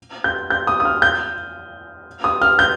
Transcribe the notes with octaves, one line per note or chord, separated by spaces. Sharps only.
G6
G6
D#6
D#6
F6
G6
D#6
F6
G6